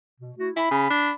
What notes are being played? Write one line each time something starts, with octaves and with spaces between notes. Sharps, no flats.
B2
A3 E4 F#4
E4 B5
C#3
D4